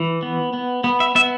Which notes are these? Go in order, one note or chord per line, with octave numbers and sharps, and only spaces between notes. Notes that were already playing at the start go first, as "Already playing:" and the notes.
Already playing: E3
B3
B3
B3
E5
B3 E5